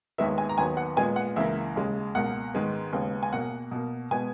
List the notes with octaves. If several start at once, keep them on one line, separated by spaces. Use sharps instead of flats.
D#2 D#3 G#3 B3 E5
G#5
A#5
D#2 D#3 F#3 B3 G#5
F#5
A#2 G#3 B3 G#5
F#5
C#2 C#3 E3 A#3 E5
D#2 C#3 G#3
C#2 B2 A#3 F#5
G#2 D#3 G#3 B3
D#2 C#3 G#3 B3
G#5
B2 A#3 F#5
B2 A#3
B2 G#3 B3 G#5